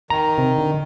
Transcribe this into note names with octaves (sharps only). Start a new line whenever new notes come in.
D#3 A#5
C3
D3